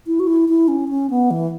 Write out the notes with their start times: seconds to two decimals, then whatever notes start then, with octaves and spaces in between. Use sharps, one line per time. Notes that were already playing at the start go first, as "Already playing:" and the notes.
0.07 E4
0.19 F#4
0.27 E4
0.49 E4
0.68 C#4
0.89 C#4
1.10 B3
1.31 E3